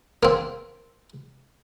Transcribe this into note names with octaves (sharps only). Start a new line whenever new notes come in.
A#3 C4